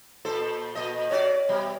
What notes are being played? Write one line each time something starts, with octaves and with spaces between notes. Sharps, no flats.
A#2 A4 C5
A#2 D#5
C3 F#4 C#5 D5
B2 G3